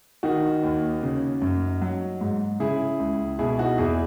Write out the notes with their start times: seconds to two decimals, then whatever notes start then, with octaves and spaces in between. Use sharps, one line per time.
0.23 D#3 D#4 F#4
0.63 D#2
1.03 C#3
1.42 F#2
1.81 F#3
2.21 G#2
2.60 C#3 E4 G#4
3.00 C#2
3.39 B2 E4 G#4
3.59 D#4 F#4
3.78 E2 E4 G#4